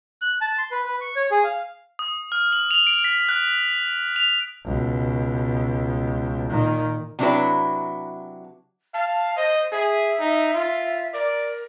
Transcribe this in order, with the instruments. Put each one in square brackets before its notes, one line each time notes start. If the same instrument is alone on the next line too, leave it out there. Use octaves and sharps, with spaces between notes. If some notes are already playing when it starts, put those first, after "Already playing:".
[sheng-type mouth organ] F#6
A5
C6
B4
B4
C#6
C#5
G#4
F5
[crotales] D#6
F6
F#7
F7
D7
B6
F#6
F7
[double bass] C#2 B2
A#2 D#3
[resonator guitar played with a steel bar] C3 F#3 D4 E4 F#4 B4
[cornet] F5 [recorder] A5
[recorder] C5 [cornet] D#5
[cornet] G#4 [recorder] E5
[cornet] D#4
F4
[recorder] A#4 [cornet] D5